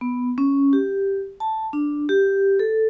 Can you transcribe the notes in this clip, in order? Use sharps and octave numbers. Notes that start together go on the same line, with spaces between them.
B3
C#4
G4
A5
D4
G4
A4